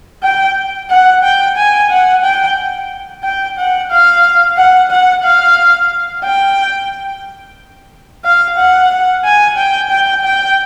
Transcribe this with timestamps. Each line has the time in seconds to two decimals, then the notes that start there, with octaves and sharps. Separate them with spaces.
0.23 G5
0.90 F#5
1.24 G5
1.57 G#5
1.90 F#5
2.24 G5
3.24 G5
3.58 F#5
3.91 F5
4.57 F#5
4.91 F#5
5.24 F5
6.24 G5
8.25 F5
8.57 F#5
9.25 G#5
9.58 G5
9.91 G5
10.25 G5